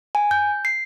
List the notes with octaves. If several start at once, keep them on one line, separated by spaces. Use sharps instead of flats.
G#5
G6
C7